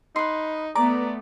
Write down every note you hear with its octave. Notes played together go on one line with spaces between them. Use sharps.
D#4 B4 C6
A3 B3 D5 A#5 D6